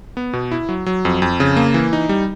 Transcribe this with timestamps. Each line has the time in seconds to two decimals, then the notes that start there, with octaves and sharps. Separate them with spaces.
0.17 B3
0.33 B2
0.51 E4
0.69 F#3
0.86 F#3
1.05 F2
1.22 F2
1.40 C#3
1.57 A#3
1.74 E3
1.93 D#4
2.09 G3